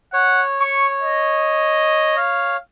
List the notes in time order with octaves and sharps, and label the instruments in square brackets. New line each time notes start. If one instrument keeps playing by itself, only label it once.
[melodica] C#5 [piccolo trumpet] F#5
[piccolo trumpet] C#6
D#5
F5